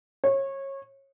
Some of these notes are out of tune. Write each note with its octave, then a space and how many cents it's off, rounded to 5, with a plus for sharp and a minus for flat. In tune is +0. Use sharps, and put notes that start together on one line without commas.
C#5 -25